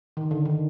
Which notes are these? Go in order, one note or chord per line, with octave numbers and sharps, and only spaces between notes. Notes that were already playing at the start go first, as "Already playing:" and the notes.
D#3
D3
D#3